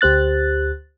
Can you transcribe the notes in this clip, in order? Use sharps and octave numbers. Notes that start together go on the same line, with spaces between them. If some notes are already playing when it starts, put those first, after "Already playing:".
D2 G4 C5 F#6 A6